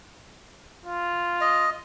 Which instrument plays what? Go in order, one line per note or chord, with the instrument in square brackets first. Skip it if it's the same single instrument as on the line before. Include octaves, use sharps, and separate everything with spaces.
[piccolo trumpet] F4
[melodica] D#5